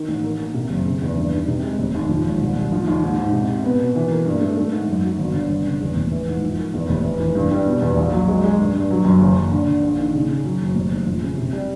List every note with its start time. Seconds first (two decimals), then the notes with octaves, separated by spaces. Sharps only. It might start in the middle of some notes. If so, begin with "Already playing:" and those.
Already playing: D#3
0.08 A1
0.24 A#3
0.39 A#3
0.54 C3
0.70 F#1
0.86 C#3
1.02 E2
1.17 G2
1.33 D#3
1.47 C3
1.64 G#3
1.79 F1
1.95 D#2
2.09 F3
2.24 G#1
2.41 C2
2.56 C2
2.72 F3
2.87 D#2
3.03 G#2
3.18 G#2
3.33 C3
3.48 C3
3.64 B3
3.80 B2
3.96 E3
4.11 A#3
4.26 G2
4.41 A3
4.57 A3
4.73 G#2
4.88 F#2
5.04 F#3
5.18 G1
5.34 D3
5.50 G1
5.66 C#3
5.80 E2
5.96 F1
6.11 E3
6.28 G#2
6.42 F3
6.59 A#3
6.74 E2
6.89 F1
7.04 E3
7.20 E3
7.35 G2
7.51 G3
7.66 B2
7.82 E2
7.97 A#1
8.12 F#3
8.28 G#3
8.44 G#3
8.59 G2
8.75 G2
8.91 F#3
9.05 F#2
9.20 F#1
9.36 F#1
9.52 D3
9.68 D3
9.82 A#1
9.98 D#3
10.14 C#3
10.29 C#3
10.44 F#3
10.61 F#1
10.75 F1
10.92 F1
11.07 F3
11.22 C#3
11.38 C3
11.53 G3